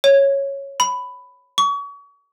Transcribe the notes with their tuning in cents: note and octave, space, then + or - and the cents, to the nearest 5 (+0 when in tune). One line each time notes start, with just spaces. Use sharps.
C#5 -5
B5 +10
C#6 +35